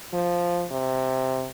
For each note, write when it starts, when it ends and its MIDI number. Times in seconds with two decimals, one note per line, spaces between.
0.14 0.65 53
0.72 1.49 48